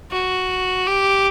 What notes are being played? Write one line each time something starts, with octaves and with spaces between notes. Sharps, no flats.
F#4
G4